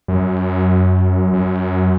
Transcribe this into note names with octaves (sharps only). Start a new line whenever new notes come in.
F#2
F#2